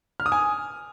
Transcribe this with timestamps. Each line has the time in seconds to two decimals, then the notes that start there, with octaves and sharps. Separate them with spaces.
0.20 F6
0.26 D#6
0.32 G#5